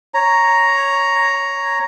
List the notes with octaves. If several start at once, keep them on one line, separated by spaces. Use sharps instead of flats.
C#5 A#5